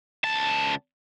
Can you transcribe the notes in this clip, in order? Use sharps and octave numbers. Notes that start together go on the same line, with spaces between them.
C#2 A5